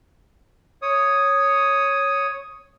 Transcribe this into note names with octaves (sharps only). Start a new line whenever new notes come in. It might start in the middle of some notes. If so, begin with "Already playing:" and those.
C#5 D#6